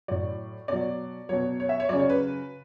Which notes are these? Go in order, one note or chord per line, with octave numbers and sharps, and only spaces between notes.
A2 F#3 D5
B2 F#3 D5
B2 F#3 C#5
C#5
E5
C#5
C#3 F#3 D5
C#5
B4